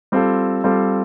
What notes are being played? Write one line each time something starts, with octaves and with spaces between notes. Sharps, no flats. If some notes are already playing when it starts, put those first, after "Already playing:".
G3 C4 F4 A4
G3 C4 F4 A4